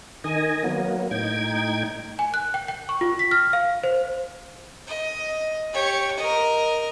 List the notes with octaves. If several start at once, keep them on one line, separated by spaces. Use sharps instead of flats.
D#3 D#5 G#5
F#3 A#3 B3
A2 D#4 G5 G#6
G#5
F#6
G5
G5
C#6
F4
B6
F6
F5
C5
D#5
G4 C#5
A#4 D#5